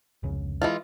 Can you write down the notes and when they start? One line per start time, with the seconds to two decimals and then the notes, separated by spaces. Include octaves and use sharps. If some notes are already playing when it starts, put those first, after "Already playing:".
0.23 F1 C#2 C#3
0.62 E3 G#3 F4